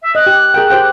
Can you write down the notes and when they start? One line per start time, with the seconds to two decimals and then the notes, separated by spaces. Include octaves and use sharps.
0.02 E5
0.15 D#5 F#6
0.27 G4
0.54 G#4 A#4 G5
0.70 G4 C5 G5